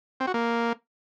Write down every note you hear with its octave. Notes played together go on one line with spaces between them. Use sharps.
C4
F#4
A#3